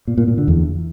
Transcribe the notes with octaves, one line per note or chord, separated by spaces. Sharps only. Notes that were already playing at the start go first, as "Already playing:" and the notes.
A#2
A#2
A#2
D3
E2